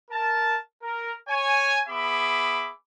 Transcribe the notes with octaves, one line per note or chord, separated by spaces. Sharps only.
A#4 A5
A#4
C#5 G#5
B3 G#4 E5 B5 D6